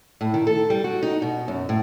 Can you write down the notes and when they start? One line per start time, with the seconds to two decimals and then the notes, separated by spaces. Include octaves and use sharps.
0.21 A2
0.34 D#3
0.47 A4
0.70 G3
0.84 F#4
1.03 D#4
1.22 B2
1.48 F#2
1.69 A2